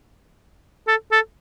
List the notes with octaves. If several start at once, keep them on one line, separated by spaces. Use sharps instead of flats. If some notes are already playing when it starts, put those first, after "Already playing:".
A4
A4